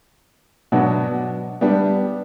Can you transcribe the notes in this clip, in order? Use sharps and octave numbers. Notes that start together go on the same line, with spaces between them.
B2 F#3 B3 D4
G3 B3 D4 G4